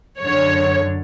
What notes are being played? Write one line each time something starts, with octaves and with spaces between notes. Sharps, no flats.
F#2 D3 C#5